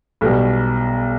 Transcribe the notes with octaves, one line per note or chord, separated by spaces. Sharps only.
B1 B2 G3